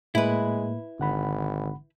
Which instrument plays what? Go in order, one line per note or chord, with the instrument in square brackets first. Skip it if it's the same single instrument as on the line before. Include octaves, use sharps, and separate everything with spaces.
[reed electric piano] A2 A#3 [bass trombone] G#3 [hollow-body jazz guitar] E4 B4
[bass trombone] G#1 [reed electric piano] D3 F#5 B5